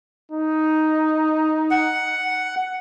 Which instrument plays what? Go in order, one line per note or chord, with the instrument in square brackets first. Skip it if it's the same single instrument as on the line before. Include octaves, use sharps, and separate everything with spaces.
[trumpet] D#4
[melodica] F#5